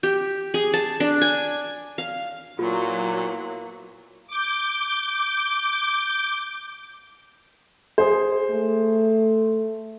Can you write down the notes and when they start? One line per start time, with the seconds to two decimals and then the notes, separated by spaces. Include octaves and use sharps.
0.03 G4
0.54 G#4
0.74 A5
1.00 D4
1.22 G#5
1.98 F5
2.59 A#2 F#3 A#3 B3 E4 F4
4.28 D6 G6
7.98 G#4 C5
8.51 A3